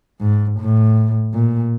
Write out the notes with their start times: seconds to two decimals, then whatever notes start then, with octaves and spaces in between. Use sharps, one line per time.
0.21 G#2
0.60 A2
1.34 A#2